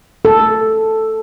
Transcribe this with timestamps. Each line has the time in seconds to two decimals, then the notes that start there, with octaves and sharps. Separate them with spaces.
0.25 A4